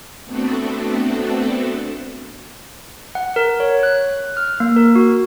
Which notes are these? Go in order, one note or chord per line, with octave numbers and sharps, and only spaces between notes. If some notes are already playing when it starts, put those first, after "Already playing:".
A3 B3 C4 D4 F#4 A4
F#5
A#4
C#5
F#6
F6
A#3
A#4
F#4